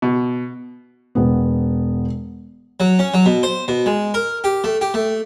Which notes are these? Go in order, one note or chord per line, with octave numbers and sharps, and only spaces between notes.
B2
E1 B3
F#3
C#4
F#3
B2
C5
B2
G#3
A#4
G4
A3
G4
A3